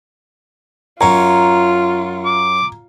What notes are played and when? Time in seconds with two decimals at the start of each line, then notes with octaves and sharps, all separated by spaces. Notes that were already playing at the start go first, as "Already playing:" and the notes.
1.01 F#2 C#4 F4 A#5
2.25 D6